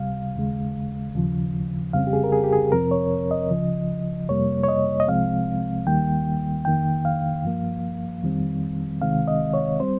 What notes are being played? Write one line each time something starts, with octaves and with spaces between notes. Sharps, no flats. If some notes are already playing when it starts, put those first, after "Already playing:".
Already playing: C#2 C3 G3 F5
D#2 C#3 G#3
D#2 C#3 F3
F2 C#3 G3 C4 F5
G4
G#4
A#4
G#4
G4
G#4
F2 C3 F3 C4 A#4
C#5
D#5
C#2 C#3 F3
F2 C3 G3 A#3 C#5
C#5
D#5
D#5
C2 C3 F3 G#3 C4 F5
D#2 D#3 G3 A#3 G5
F2 D#3 A#3 G5
F5
G2 F3 A#3
F2 D#3 G3 C4
C#2 C3 D#3 G#3 C4 F5
D#5
C#5
G3 C4 C5